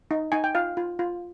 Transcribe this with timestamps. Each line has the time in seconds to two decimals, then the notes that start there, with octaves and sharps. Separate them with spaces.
0.11 D#4
0.32 D#4 G#5
0.44 G5
0.55 F4 F5
0.77 F4
0.99 F4